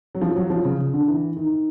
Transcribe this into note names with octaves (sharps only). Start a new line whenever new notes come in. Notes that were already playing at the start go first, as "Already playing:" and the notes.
F#3
F3
F#3
F3
C#3
D3
E3
D#3